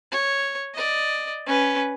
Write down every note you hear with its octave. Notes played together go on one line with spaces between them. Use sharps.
C#5
D5 D#5
C#4 B4